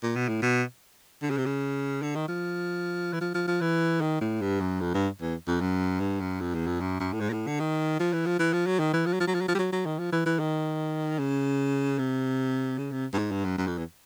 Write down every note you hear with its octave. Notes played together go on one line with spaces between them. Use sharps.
A#2
B2
A2
B2
D3
C#3
C3
C#3
D3
D#3
F3
E3
F3
F3
F3
E3
D#3
A2
G2
F#2
F2
G2
E2
F2
F#2
G2
F#2
F2
E2
F2
F#2
F#2
A2
G#2
A#2
A2
D3
D#3
F3
E3
F3
E3
F3
F#3
D#3
E3
F3
F#3
F3
F#3
F3
F#3
F3
G3
F#3
F#3
D#3
F3
E3
E3
D#3
C#3
C3
C#3
C3
G2
G#2
G2
F#2
F#2
F2
E2